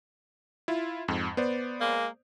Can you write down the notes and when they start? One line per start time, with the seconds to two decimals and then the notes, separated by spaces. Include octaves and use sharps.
0.68 E4 F4
1.08 F2 G#2
1.37 B3 C5 D5
1.79 G#3 A#3